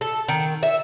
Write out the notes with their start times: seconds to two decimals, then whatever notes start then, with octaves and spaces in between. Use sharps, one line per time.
0.01 A4
0.28 D#3
0.63 E5